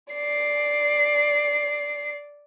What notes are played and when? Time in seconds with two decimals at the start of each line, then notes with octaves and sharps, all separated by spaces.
0.14 D5 C7